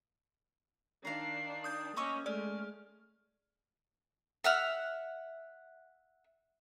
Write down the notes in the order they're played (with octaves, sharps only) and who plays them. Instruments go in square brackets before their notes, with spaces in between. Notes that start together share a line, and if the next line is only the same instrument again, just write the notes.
[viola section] D#3 D4 [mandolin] F5 A#5 [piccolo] C7
[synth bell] D#6 G6
[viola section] A#3 C#4 [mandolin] D#5 C#6 D6 [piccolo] E6
[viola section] G#3 A3 [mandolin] C#4 [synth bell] D5 [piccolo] F6
[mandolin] E5 F#5 F6